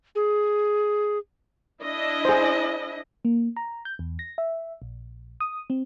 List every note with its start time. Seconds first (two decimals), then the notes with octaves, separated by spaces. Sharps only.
0.15 G#4
1.81 D4 E4 D#5
2.25 G#4 C5
3.25 A#3
3.56 A#5
3.85 G6
3.99 E2
4.19 A#6
4.38 E5
4.82 A#1
5.40 D#6
5.70 C4